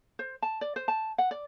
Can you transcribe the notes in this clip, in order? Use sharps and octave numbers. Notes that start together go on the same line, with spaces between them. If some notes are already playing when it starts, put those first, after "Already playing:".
C5
A5
D5
C5
A5
F#5
D5